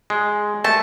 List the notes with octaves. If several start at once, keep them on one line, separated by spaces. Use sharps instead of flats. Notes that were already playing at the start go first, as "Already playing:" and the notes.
G#3
A3 A5